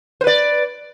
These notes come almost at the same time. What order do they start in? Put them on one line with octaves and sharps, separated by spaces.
C5 B4 D5